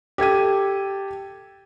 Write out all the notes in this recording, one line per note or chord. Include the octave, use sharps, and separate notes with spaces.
G4 A4 G#6 D#7